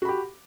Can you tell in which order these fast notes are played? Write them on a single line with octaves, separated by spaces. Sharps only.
F#4 B5 G4